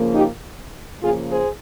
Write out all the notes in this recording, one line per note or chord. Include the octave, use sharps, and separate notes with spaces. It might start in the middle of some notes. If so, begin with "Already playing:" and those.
Already playing: C#3 F3 A#3
D#4 G4
C#3 F3 A#3 F4 G#4
G#4 C5